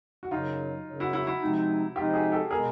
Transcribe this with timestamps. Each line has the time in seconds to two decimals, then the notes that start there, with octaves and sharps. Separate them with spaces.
0.23 F#4
0.31 F#2 C#3 F#3 D#4 F4
0.86 F#2 C#3 F#3
1.00 E4 F#4
1.13 E4 F#4
1.27 E4 F#4
1.41 C3 F3 G#3 C4 D#4
1.96 C3 F3 G#3 C4 D#4 F4 G4
2.14 F#4 G#4
2.32 G4 A4
2.50 B2 G#3 B3 E4 G#4 A#4